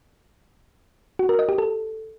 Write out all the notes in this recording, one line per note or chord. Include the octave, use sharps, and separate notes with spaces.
F#4
A#4
D#5
G4
A4